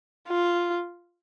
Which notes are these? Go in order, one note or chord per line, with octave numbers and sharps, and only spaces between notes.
F4